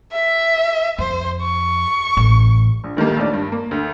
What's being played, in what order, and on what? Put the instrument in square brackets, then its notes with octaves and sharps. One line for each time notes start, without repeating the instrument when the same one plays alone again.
[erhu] E5
[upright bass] F2 [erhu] C5
[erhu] C#6
[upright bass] A1
[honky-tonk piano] A#1
D2 D#3 G3 A#3
A#1 D#2 A3 D5
G2
A#3
D2